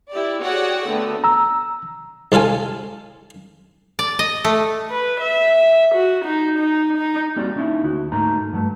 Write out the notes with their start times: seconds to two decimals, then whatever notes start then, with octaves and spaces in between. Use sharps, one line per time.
0.10 E4 G4 D5
0.41 F#4 G#4 C#5 D5 F#5 G5
0.87 D3 A3 B3
1.24 A#5 E6
2.32 C2 D3 F4 A4 G#5
3.99 D5
4.19 D#5
4.44 A3
4.91 B4
5.21 E5
5.95 F#4
6.25 D#4
6.58 D#4
6.97 D#4
7.36 G3 A#3 C4 F#4 D5
7.56 A#3 C#4 D#4 E4
7.83 D2 F#4
8.12 G#2 A3 A#3 D#4 A#5
8.52 G2 F#3 A3